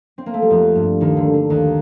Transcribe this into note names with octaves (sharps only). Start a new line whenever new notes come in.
C4
A#3
A3
G3
F2 F3
G2 G3
D#2 D#3
D3
D3
D#2 D#3